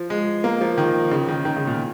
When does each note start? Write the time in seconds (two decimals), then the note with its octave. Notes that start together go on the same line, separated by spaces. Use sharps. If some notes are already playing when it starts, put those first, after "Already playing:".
Already playing: F3
0.10 G#3
0.44 A#3
0.61 F3
0.78 D#3
1.11 C#3
1.29 D#3
1.45 D#3
1.56 C#3
1.67 A#2